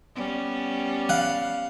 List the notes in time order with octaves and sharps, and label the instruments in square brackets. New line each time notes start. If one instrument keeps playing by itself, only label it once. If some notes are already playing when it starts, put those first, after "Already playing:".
[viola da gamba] G3 B3 C#4
[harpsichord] F5 F#5